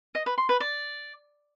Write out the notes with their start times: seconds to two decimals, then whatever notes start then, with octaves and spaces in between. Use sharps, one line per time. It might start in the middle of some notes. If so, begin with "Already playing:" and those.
0.15 D#5
0.26 B4
0.38 C6
0.49 B4
0.60 D5